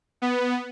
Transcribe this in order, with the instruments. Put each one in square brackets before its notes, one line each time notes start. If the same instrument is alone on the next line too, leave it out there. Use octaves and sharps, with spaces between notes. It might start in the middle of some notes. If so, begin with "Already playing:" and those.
[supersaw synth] B3